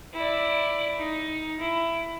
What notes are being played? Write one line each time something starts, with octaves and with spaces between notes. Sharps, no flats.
E4 D5
D#4
E4